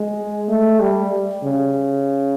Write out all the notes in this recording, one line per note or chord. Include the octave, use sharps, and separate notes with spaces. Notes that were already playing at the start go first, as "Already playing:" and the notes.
Already playing: G#3
A3
G3
C#3